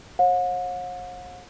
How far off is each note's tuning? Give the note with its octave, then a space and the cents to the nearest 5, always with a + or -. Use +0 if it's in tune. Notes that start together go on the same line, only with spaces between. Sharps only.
C#5 -40 F#5 -45